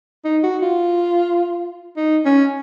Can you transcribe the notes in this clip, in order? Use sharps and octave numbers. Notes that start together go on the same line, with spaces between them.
D#4
F#4
F4
D#4
C#4